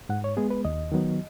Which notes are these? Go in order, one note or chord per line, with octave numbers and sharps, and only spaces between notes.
G#2 F#5
C#5
G#3 B3 G#4
B4
D#2 D#5
D#3 F#3 B3